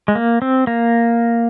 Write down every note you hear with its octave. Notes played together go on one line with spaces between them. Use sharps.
G#3
A#3
C4
A#3